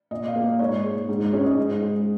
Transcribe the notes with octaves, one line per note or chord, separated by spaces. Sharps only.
A#2 D#5
F5
A#3
D#5
G#2 C#5
G#3
G#2
D#4
G#3 C#4
D#5
G#2
G#3